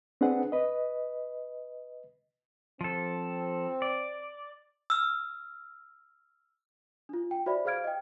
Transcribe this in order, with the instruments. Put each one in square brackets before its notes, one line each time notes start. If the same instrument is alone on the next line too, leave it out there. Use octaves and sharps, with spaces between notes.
[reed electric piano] C4 D4 G#4 B4 F#5
B4 D#5
[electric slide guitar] F3 A4 [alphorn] C4
[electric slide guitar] D5
[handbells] E6 F6
[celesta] D4 F4
G5
F#4 C5 D5 E5 B5
G#4 C5 F5 F6 G#6 D7
D#5 G5